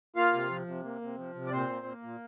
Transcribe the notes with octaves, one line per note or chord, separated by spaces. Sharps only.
A#3 F4 F5
C3
F3
C3
A#3
C3
F3
C3
D5
A#2 C4 C5
A#3
A#3
A#2